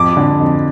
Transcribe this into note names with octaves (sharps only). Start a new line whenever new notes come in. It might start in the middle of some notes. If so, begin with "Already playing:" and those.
Already playing: F2 D6
D3
F2